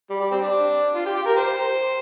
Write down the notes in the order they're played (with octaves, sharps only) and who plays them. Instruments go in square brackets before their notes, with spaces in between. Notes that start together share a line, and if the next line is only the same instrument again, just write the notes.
[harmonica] G3
G3
C4
D4
F4
G4
G4
A#4
G4 C5